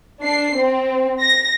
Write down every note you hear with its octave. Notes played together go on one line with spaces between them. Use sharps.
D4 C7
C4
A#6